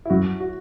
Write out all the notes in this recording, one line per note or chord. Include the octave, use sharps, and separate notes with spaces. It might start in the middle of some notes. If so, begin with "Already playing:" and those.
E4
F#2 F#4
F#4